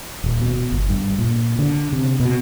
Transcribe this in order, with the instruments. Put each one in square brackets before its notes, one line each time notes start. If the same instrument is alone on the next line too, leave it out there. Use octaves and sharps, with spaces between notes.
[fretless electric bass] D#1
B2
G1
G2
A#2
D3
C3
B2